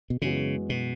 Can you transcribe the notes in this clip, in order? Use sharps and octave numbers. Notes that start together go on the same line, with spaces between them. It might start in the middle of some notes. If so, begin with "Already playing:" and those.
B2
F#2 C#3 E3 G#3 B3 F#4
B2